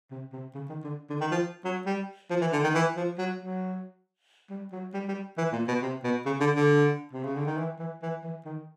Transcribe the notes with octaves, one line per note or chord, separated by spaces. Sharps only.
C3
C3
C#3
D#3
D3
D3
D#3
F3
F#3
G3
F3
E3
D3
D#3
E3
F3
F#3
F#3
G3
F#3
G3
G3
E3
A#2
B2
C3
B2
C#3
D3
D3
C3
C#3
D3
D#3
E3
E3
E3
E3
D#3